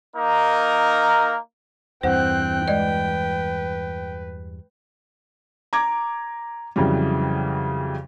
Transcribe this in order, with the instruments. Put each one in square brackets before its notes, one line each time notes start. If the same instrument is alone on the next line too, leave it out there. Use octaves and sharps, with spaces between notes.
[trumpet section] A#3 D#4 A#4
[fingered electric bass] E2 G2 E3 [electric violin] C4 F#6 [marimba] C5 F#5 [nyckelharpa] G5
[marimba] G#3 D5 D#5 [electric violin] B4
[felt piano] A#5 D6 G#6
F2 C#3 E3 F#3 G3